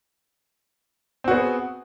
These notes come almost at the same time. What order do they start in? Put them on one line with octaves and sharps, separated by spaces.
C4 F#4 B3 G#4